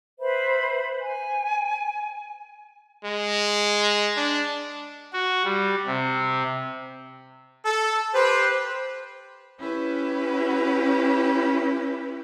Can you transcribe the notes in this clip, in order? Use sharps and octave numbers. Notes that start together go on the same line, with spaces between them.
B4 C5 E5 B5
G#5
G#3
D4
F#4
G3
C3
A4
G4 B4 C5
C#4 E4 G4 B4